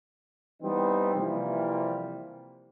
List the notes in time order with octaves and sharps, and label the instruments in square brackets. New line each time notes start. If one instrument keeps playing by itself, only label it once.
[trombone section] E3 G3 B3 C4 D#4
C3 E3 F3 G3 A#3